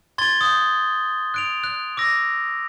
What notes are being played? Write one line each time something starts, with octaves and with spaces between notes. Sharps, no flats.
C6 G#6 A6 G7
D#6 G6
F#6 D7 F7
F#6
D6 E6 A#6